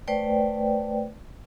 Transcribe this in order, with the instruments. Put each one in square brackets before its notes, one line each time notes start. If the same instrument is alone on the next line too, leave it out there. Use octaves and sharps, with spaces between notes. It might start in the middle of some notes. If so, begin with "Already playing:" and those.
[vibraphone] A3 B4 C5 D5 G5